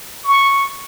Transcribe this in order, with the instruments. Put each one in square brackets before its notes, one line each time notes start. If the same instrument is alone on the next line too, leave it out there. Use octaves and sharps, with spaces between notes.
[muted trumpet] C#6